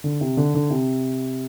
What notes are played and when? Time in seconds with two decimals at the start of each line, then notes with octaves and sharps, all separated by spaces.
0.04 D3
0.21 C3
0.37 D3
0.55 D3
0.70 C3